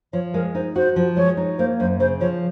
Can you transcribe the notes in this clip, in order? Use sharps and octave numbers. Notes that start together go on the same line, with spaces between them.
F3 C#5
G#3 A#4
D#4 C5
F#4 C5
F3
G#3 C#5
D#4
A#3 C5
F#2 C5
C#3 C5
F3 C#5